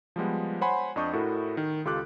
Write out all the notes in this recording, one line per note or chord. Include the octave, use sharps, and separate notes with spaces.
F3 G3 G#3 B3
C5 C#5 F#5 G#5 B5 C6
F2 D4 D#5 C#6 D#6 G6
A2 E4 F#4 A4 A#4
D#3
C#2 F4 G4 A4 D6 F#6